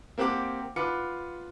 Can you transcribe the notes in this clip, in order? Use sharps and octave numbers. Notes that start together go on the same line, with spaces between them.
A#3 C4 G4 F#5 D6
F4 B4 F#5 D6 C#7